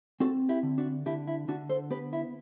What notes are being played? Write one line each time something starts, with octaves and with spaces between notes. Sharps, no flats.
C4 F#4 A4
E4 G4
D3
D4 F#4
D3 E4 G4
E4
D3 D4 F#4
A4 C5
B3 G4 B4
E4